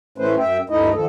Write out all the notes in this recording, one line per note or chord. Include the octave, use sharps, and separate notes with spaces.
A2 E3 A3 C#4 B4 C5
F#2 E5 G5
D2 G2 A3 D#4 E4 D#5
D#3 F3 A4